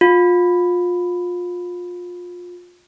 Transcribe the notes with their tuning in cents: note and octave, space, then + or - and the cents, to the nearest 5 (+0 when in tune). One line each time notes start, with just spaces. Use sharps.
F4 +25